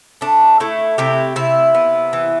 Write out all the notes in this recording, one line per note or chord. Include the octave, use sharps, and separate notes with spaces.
A3 D4
A3 E4
C3 E4 G4
C3 E4
B3
E3